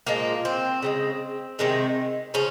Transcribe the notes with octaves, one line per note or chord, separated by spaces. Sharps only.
A#2 F3 G#3 A#3
C4
C#3 F3 G#3
C3 D#3 G#3
C#3 F3 C#4